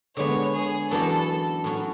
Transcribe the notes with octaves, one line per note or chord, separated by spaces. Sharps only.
D3 G#3 B3 C#5
G#4
F#2 E3 B3 D4 F#4 A4
A2 F#3 C#4 F#4